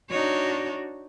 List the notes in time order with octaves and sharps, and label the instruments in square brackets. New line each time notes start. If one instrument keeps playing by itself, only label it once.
[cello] D4 F#4 [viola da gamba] D#4 C#5